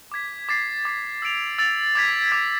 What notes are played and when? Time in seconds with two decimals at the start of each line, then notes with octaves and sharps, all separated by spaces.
0.12 D6 G#6 B6
0.49 D6 A6 C7
0.85 D6 A6 C7
1.22 E6 A6 D7 F7
1.58 E6 A6 D7 F7
1.95 D6 G#6 B6 F7
2.32 D6 G#6 B6 F7